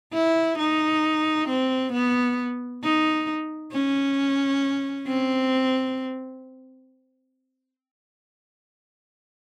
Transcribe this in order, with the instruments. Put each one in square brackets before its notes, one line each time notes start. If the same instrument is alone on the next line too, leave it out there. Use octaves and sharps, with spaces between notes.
[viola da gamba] E4
D#4
C4
B3
D#4
C#4
C4